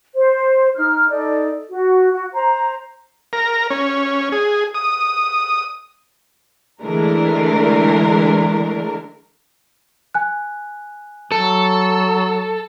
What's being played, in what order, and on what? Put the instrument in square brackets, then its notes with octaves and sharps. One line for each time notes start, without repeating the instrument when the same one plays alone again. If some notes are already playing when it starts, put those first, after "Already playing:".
[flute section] C5
D#4 F6
D#4 A4 D5
F#4
F#4
C5 A#5
[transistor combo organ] A#4
C#4
G#4
D#6
[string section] D3 E3 G#3 A3 D4 A#4
[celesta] G#5 F#6
[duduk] F#3 [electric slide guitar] A4